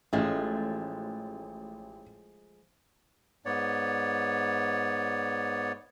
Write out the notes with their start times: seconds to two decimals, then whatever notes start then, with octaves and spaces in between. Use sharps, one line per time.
0.13 A1 F3 G#3 A3 C#4
3.46 G#2 B3 C#5 D5